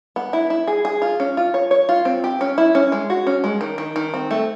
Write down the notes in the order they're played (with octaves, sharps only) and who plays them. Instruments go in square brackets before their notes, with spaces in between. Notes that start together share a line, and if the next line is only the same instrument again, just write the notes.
[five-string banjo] B3
E4
E4
G#4
G#4
F4
C#4
F4
C#5
C#5
F4
C4
G4
C#4
E4
C#4
G#3
F#4
C#4
G#3
D#3
D#3
D#3
C4
A3